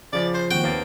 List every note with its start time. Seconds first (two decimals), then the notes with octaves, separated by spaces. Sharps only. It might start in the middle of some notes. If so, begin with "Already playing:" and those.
0.13 C#3 F3 D5
0.34 C5
0.51 D#3 A#3 C4 F#4 G5
0.64 D#2 A#3 B3 C#5 A6